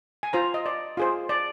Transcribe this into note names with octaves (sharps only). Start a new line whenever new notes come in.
G#5
F4 C5 A#5
D#5
D5
F4 G#4 C5
D5